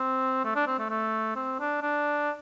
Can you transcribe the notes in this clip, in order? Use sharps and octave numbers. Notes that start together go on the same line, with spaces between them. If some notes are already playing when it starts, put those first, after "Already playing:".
Already playing: C4
A3
D4
C4
A3
A3
C4
D4
D4